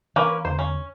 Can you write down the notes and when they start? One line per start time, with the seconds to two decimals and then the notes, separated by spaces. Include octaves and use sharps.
0.16 E3 A#3 C#4 B4
0.45 E2 D3 C5
0.59 C#4